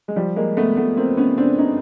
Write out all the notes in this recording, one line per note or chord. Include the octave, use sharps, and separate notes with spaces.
G#3
F3 G3
G#3 A#3
A3 B3
A3 B3
A#3 C4
B3 C#4
C4 D4
C#4 D#4